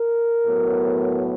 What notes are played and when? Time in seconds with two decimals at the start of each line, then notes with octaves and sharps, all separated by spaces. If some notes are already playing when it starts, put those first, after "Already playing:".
Already playing: A#4
0.46 A2 F#3 B3